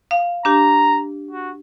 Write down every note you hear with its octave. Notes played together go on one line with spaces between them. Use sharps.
F5
D4 G4 A#5
F#4